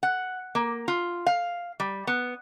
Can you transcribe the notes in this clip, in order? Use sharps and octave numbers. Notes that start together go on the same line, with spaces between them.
F#5
A#3
F4
F5
G3
B3